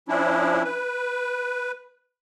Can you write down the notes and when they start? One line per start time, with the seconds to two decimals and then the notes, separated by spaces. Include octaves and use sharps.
0.08 F3 C#4 D4 E4
0.64 B4